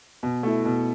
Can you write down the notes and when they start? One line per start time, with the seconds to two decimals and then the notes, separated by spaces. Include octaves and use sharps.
0.23 B2
0.43 A3 E4
0.65 B2